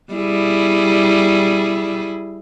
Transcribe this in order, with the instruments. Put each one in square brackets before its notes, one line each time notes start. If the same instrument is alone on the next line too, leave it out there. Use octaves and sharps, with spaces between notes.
[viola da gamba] G3 E4 G#4